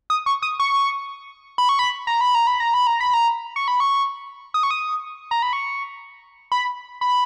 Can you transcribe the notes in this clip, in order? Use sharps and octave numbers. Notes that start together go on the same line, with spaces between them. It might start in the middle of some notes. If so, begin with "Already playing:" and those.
D#6
C#6
D#6
C#6
B5
C#6
B5
A#5
B5
A#5
B5
A#5
B5
A#5
B5
A#5
C#6
B5
C#6
D#6
C#6
D#6
A#5
B5
C#6
B5
B5